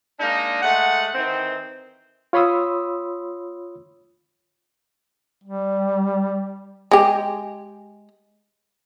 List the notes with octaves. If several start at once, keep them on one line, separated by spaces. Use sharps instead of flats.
G#3 A#3 D4 D#4
G#3 A3 F#5
D#3 E3 C4
F4 C#5 B5 C6 D#6 E6
G3
G#3 G4